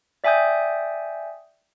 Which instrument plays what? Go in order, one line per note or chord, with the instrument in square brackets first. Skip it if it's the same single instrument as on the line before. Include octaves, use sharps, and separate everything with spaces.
[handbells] D5 E5 G5 G#5 D#6 G6